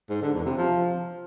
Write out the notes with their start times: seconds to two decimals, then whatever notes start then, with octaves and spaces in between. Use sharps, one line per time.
0.09 G#2
0.21 D3
0.33 E2
0.45 C3
0.57 F3